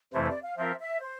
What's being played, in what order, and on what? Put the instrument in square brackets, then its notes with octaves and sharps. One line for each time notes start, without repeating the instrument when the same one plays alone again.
[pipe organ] F2 C3 E3 A3 E4 [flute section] C5
[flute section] C5
D5
F5
[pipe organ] F3 C4 F4 A#4 [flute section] E5
[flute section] E5
C5